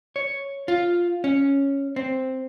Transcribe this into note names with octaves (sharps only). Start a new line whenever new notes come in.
C#5
F4
C#4
C4